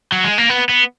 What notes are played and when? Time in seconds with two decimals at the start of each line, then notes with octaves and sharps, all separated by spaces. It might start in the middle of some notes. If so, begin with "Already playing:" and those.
0.12 F#3
0.24 G#3
0.38 A#3
0.49 B3
0.69 B3